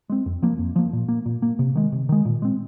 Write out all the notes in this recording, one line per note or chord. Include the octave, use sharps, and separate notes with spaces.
G#3 C4
F2
F3 A#3
F2
F3 A#3
A#2
A#3
A#2
A#3
C3
D#3 G#3
C3
D#3 G#3
A#2
G#3 C4